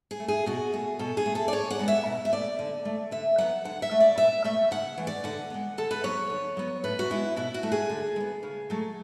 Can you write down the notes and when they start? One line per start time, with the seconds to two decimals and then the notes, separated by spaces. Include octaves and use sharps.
0.11 G#4
0.20 A3
0.28 G#4
0.46 B2 F#4
0.73 A3 G#4
0.99 B2 A4
1.17 G#4
1.26 A3
1.35 A4
1.48 D5
1.53 A2 C#5
1.71 F#5
1.79 G#3 B3
1.88 E5
2.06 B2
2.25 E5
2.32 A3 D5
2.59 D3
2.85 A3
3.11 D3 E5
3.38 F#3 B3 F#5
3.65 D3 F#5
3.82 E5
3.91 A3
4.00 D5
4.18 B2 E5
4.44 A3 E5
4.71 C#3 F#5
4.98 E3 A3
5.07 D5
5.24 D3 F#5
5.50 G#3 B3
5.78 D3 A4
5.91 B4
6.04 F#3 B3 C#5
6.30 D3
6.57 F#3 B3
6.84 A2 B4
6.99 F#4
7.10 G#3 B3 E4
7.36 B2 E4
7.54 F#4
7.63 A3
7.72 G#4
7.89 D3
8.16 G#3
8.20 B3
8.43 C#3
8.70 F#3 A3